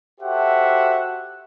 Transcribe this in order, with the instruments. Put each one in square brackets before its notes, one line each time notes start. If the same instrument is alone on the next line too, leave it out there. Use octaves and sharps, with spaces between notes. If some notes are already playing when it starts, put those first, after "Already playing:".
[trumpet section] F#4 G4 A4 C5 E5 F#5